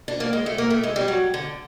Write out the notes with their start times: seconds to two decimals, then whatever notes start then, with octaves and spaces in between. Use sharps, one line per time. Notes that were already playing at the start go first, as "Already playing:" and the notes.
0.08 D4
0.20 A#3
0.33 G#3
0.46 A3
0.58 A#3
0.70 A3
0.83 G#3
0.96 G3
1.08 F#3
1.34 D3